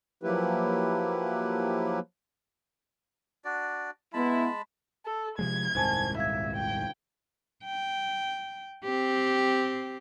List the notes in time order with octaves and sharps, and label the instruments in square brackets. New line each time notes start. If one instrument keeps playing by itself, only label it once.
[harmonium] F3 F#3 A#3 E4 G4 B4
[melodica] D4 F#4 D5
[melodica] G#3 A5 B5 [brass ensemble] B3 E4
[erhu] A4
[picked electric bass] C3 F3 G#3 [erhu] G#6
[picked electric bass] D#1 C2 G#2 [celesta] C5 G#5 A5
[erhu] E5 [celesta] F5 G#6
[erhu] G5
[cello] G5
C4 G4